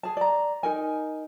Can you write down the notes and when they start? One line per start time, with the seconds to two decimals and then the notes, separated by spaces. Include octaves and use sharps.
0.03 G#4 A5
0.17 D5 A#5
0.63 D#4 A#4 G#5